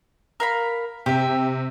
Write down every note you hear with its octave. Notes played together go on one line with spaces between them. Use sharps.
A#4 F5 B5
C3 G4 E5